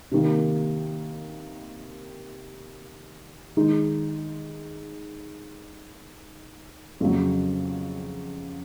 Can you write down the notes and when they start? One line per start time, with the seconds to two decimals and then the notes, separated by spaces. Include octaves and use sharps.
0.12 C3 D#3 A#3
3.57 D#3 G#3 D#4
7.00 F2 C#3 F#3